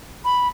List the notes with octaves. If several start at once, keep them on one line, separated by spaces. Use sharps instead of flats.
B5